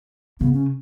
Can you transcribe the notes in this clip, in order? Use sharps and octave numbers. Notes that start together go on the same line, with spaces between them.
C#3 B3
C#4